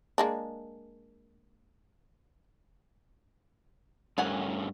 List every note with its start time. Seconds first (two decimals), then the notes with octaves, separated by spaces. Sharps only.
0.18 G#3 A#3 D4
4.18 G2 A3 C#4 A#4 F#5 G#5